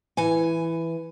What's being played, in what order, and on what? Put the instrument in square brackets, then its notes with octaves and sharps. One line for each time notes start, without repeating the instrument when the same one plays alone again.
[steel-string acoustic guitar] E3 G#5